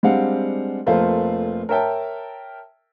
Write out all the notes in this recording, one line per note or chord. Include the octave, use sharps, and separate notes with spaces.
G3 G#3 C4 D4 F5 F#5
F1 A3 A#3 F4 C5
A#4 C#5 E5 G5 A5